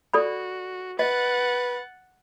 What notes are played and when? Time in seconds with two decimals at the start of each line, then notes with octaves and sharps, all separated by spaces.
0.14 F#4 A4 D5 B5
0.99 B4 D#5 F#5 A6